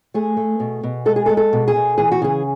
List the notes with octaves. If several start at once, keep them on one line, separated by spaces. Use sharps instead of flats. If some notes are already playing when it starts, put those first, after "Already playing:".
A3 G#4
A3
B2
B2
G#3 A4
G#4
A4
G#3
A4
B2
G#4
B2
E3 G#4
F#4
C#3 G#4